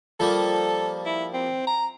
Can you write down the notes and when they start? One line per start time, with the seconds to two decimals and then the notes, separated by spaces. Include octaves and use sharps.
0.20 F3 G3 A#3 A4
1.06 E4
1.34 C4
1.67 A#5